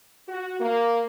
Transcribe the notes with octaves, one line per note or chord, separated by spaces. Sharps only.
F#4
A#3